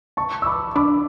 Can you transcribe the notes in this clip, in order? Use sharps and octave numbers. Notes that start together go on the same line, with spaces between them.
A5 C#6
E6
B5 D6
D4 B5 D6